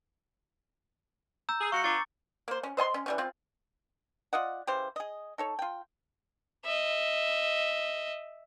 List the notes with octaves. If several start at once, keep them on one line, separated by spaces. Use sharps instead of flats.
A#5 E6 G6
G#4
G#3 F#4 F5 C#6 C#7
B3 D4 F4 A#5 D6 A6
A#3 C5
C#4
C5 D#5 G#5 C6
C#4
E3 G3 C#4
C4 F4
F4 D5 D#5 F#5
C#3 E3 G4 C5
G#4 D#5
D#4 A4 C#5
F4 G5
D#5 E5